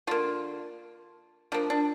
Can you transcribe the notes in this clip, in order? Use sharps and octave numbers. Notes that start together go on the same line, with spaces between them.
D3 A#3 F4
F3 A#3 D4
D4